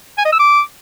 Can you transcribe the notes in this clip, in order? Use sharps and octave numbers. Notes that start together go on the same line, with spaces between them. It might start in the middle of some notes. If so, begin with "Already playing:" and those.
G#5
D#5
E6
D6